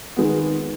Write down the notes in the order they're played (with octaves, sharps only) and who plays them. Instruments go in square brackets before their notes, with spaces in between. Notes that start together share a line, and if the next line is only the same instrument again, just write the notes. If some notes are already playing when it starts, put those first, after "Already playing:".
[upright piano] D#3 G#3 B3